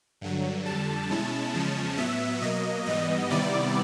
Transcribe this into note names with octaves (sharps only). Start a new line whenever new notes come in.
G2 D3 F#3
F2 D3 G3 A5
B2 G#3 C#4 E4
E2 C#3 F3 G#3 C#4
A2 F#3 B3 E5
B2 F#3 A#3 D#5
G#2 E3 G3 B3 D#5
C3 D#3 G3 B3 E4 D5